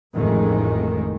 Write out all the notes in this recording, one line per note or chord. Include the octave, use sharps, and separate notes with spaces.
A1 F2 D#3 G#3